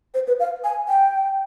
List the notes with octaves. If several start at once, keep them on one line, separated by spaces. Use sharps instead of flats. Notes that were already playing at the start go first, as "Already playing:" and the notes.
C5
B4
F5
G#5
G5